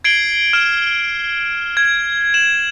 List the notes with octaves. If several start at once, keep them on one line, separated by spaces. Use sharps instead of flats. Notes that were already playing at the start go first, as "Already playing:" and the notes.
G#6 C7 D7 F#7 G7
F6 E7
G#6
E7 F#7